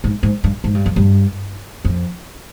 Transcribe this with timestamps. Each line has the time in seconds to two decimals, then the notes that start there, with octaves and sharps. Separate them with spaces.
0.04 G#2
0.23 G#2
0.44 G2
0.64 G#2
0.75 G2
0.86 F2
0.96 G2
1.85 F2